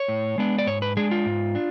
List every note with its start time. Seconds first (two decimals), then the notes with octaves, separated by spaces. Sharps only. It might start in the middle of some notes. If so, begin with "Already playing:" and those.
Already playing: C#5
0.08 A2
0.38 G#3 B3 D4
0.59 D5
0.67 G#2 C#5
0.82 B4
0.97 G#3 D4 G#4
1.11 F4
1.26 G#2
1.55 D4